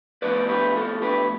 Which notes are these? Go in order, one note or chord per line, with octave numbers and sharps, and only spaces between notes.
A2 F3 B3 B4 D5
G4 B4
F4 A4
G4 B4